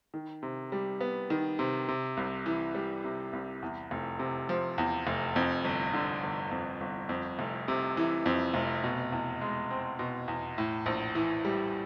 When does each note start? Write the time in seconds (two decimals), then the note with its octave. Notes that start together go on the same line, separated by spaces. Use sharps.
0.14 D#3
0.43 C3
0.72 G3
1.01 B3
1.30 D#3
1.59 C3
1.88 C3
2.17 C2
2.46 E3
2.75 G3
3.04 C3
3.33 C2
3.62 E2
3.91 F1
4.19 C3
4.49 F3
4.78 E2
5.07 F1
5.36 F2
5.65 G1
5.94 D3
6.23 G1
6.51 F2
6.81 G1
7.09 F2
7.39 F1
7.68 C3
7.97 E3
8.26 F2
8.54 F1
8.84 B2
9.12 E2
9.41 G#3
9.70 C4
9.99 B2
10.28 E2
10.58 A2
10.86 A#1
11.15 E3
11.45 G3